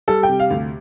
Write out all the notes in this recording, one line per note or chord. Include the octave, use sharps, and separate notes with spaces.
G3 A4
G5
C3
F5
D2